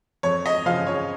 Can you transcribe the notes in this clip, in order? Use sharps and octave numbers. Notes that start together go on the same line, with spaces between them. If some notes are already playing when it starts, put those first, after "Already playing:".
F2 C#5
D#5
C#3 F3 F5
C#5